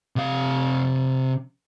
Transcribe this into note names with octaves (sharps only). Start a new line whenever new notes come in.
C3 F5